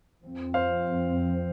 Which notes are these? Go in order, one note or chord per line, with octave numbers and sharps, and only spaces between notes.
F2 F3 C4
C5 F5